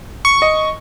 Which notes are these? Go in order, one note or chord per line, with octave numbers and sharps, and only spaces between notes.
C#6
D#5